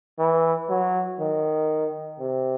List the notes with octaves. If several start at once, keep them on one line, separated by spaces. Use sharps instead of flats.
E3
F#3
D#3
C3